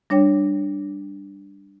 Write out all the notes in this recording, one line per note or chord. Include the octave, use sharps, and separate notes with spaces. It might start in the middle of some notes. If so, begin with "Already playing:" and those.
G3 D4 C#5 G5